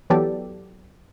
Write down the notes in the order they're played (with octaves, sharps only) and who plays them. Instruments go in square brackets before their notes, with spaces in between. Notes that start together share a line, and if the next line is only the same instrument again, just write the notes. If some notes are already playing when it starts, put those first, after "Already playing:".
[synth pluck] E3 F#3 B3 G4 A4 D5